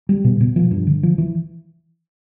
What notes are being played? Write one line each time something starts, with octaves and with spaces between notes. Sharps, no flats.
G3
B2
B2
F3
G2
D3
F3
E3